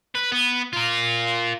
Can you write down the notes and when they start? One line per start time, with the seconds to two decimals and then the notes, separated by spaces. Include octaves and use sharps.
0.15 B4
0.32 B3
0.73 F4 A#4